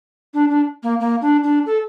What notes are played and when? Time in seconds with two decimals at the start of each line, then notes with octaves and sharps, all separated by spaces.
0.34 D4
0.50 D4
0.83 A#3
1.00 A#3
1.22 D4
1.44 D4
1.66 A4